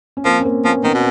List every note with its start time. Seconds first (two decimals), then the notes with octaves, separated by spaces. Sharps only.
0.17 C#4
0.25 F3 A#3 C4
0.40 C#4
0.45 A#3 C4
0.64 F3 B3 C#4
0.84 D#3 B3 C#4
0.94 B2